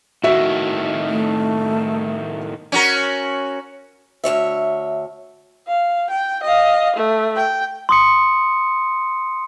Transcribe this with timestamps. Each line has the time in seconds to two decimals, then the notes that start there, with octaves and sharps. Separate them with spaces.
0.24 A2 D#3 F#4 E5
1.09 A3
2.72 C#4 F#4 A#4
4.24 D2 E3 C#5 E5
5.68 F5
6.10 G5
6.43 D#5 F5
6.96 A3
7.36 G5
7.89 C6 D#6 C#7